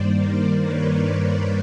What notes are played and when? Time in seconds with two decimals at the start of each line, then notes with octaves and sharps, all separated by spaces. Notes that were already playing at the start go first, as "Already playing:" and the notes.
Already playing: G2 D#3 G3 A#3 C5 D5
0.14 A#4 C5
0.61 B4 C#5
1.08 A#4 C5